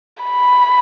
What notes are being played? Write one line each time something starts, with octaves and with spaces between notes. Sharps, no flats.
B5